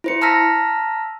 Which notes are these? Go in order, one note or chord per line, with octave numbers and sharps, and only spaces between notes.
E4 C5 C#7
A5 A#5 E6 F6 A#6 B6